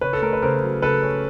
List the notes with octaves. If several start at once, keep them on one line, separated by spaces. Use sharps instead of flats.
C#3 B4 C#5
A4
A3 A#4
B4
C#3 A#4 C5
F#3
C#3 A4 B4
C#4